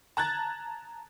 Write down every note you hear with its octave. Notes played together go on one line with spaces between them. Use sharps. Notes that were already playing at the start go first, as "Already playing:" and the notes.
A5 A#5 F#6 G#6 A6